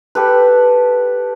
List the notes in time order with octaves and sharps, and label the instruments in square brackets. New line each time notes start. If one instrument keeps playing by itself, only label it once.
[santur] G4 A4 B4